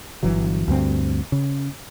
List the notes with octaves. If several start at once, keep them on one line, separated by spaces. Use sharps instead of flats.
G1 E3 F#3
D2 G2 C4
C#3